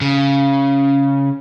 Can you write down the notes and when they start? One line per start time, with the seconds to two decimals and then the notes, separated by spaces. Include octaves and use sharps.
0.01 C#3